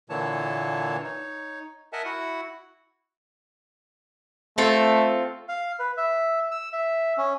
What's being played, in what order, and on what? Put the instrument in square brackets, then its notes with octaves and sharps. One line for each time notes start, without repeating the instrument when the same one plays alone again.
[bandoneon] A#2 D3 E3 A#3 C#5 A5
D#4 C#5
A#4 D#5 E5 F#5 G#5 A5
E4 F#4 F#5
[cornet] A3 [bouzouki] C4 F4 A4
[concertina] F5
B4
E5
E6
E5
C#4